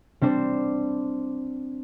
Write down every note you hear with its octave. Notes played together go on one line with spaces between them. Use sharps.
G3 C4 D4 C5